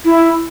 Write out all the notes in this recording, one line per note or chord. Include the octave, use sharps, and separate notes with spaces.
E4